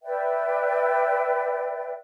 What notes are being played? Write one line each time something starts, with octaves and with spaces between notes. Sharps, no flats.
B4 D5 E5 G5